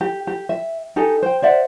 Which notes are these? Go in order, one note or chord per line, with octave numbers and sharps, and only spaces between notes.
G4
G4
E5
D#4 G4 A4 G#5
C5 G5
C5 D5 E5 F#5